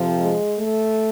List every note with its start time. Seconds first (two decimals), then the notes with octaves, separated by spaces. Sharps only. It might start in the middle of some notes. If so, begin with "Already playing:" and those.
Already playing: F2 C3 F3
0.20 G#3
0.57 A3